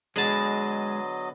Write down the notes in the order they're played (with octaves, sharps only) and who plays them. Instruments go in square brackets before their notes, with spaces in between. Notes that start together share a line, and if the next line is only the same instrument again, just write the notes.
[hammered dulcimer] D3 B3 [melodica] F#3 D#5 [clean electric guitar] G#3 [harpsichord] G#4 A5